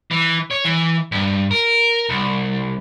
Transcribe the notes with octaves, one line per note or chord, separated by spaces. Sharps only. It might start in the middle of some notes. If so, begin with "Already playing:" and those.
E3
C#5
E3
G2
A#4
C2